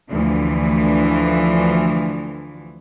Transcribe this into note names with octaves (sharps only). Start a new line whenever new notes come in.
D2 E3 F3